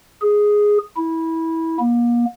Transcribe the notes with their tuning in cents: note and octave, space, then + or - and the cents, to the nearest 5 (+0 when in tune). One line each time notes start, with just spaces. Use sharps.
G#4 +0
E4 -20
A#3 +35